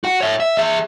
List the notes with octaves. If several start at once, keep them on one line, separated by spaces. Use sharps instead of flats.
F#4 F#5
C#5 E5
E5
G#4 E5